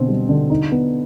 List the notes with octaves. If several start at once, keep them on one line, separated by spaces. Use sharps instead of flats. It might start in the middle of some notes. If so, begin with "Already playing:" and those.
Already playing: B2 D3 C4
G3
D3
D#4
B3